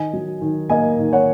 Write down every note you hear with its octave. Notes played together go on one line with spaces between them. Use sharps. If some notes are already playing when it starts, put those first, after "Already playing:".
Already playing: D#3 D#5 G#5
F#3
D#3
A#3 D#5 G#5
D#3
C#5 F#5